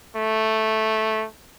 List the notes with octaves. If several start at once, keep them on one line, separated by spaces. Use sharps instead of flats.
A3